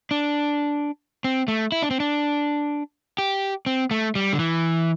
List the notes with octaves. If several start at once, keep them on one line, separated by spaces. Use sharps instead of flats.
D4
C4
A3
E4
D4
C4
D4
G4
C4
A3
G3
D3
E3